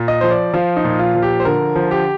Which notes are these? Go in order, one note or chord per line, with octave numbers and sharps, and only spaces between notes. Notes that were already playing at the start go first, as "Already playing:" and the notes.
Already playing: A#2
D#5
F3 C5
D5
F3 F4
D#4
A#2
F4
F3
G4
C5
D3 A#4
F3
G4